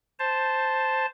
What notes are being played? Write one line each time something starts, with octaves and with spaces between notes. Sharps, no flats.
C5 A5